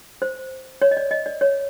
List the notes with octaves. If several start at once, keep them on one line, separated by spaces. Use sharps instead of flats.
C5
C#5
D#5
D5
D#5
D5
C#5